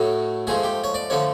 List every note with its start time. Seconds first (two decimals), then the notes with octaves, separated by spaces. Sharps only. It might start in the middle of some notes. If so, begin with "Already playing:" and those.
Already playing: A2 F#3 A3
0.47 G#2 F3 A3 G#4
0.63 G4
0.84 C#5
0.94 D5
1.10 D3 F3 A3 C#5